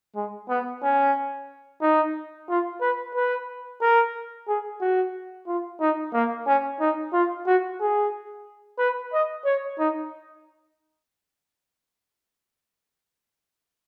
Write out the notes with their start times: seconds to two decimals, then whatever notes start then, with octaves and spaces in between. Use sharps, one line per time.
0.16 G#3
0.49 B3
0.83 C#4
1.82 D#4
2.49 F4
2.81 B4
3.15 B4
3.81 A#4
4.48 G#4
4.81 F#4
5.47 F4
5.80 D#4
6.13 A#3
6.47 C#4
6.80 D#4
7.13 F4
7.46 F#4
7.80 G#4
8.79 B4
9.13 D#5
9.45 C#5
9.79 D#4